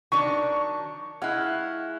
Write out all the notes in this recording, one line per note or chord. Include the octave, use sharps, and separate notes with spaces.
D#3 F#3 D4 C#6
G#3 E4 F5 F#5